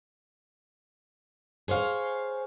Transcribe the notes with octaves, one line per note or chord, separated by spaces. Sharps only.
G#4 C5 C#5 F5